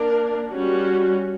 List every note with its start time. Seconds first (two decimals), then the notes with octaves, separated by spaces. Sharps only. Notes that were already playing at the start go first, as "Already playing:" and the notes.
Already playing: A#3 D4 A#4
0.51 G3 C#4 F#4